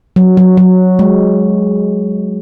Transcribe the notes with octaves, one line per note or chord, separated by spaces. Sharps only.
F#3
F#3
F#3
G#3